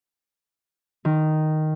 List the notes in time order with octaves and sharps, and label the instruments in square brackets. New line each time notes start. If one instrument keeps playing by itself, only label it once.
[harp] D#3